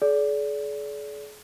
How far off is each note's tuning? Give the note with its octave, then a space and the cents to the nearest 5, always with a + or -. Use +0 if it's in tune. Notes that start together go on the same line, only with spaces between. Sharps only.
G#4 +40 D5 -30